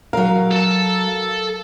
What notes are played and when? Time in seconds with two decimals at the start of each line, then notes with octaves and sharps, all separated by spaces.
0.13 F#3 A#4 F5
0.51 A4 A5